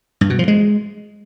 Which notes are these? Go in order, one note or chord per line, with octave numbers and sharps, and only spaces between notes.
G2
B2
F3
G#3